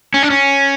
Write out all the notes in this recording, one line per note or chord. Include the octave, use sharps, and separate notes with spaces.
C#4
D4
C#4